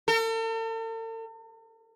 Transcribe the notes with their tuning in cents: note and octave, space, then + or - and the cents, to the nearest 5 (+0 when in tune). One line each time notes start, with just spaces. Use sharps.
A4 +45